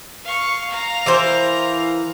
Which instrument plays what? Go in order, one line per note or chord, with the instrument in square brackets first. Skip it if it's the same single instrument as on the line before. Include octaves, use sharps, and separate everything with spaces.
[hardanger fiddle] F5 C#6
F5 A#5
[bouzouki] E3 A#4 C5